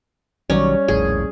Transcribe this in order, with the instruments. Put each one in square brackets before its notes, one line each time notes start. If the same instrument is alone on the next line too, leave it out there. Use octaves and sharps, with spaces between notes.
[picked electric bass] B1 D#3 F#3 [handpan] G3 C#5 D5 [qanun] C#4
[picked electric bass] D#1 A#1 A2 [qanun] G#4